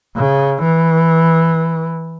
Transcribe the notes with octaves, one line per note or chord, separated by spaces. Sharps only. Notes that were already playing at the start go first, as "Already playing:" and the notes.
C#3
E3